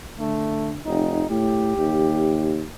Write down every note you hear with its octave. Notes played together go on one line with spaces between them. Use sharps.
D3 A3
F1 D#4
A2 G4
D#2